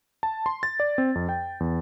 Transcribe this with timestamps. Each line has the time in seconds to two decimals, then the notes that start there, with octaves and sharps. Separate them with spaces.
0.23 A5
0.46 C6
0.63 A6
0.80 D5
0.98 C4
1.15 F2
1.29 G5
1.60 E2